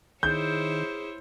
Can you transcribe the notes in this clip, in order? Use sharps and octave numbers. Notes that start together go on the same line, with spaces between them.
D#3 E4 G#4 C5 C#5 G6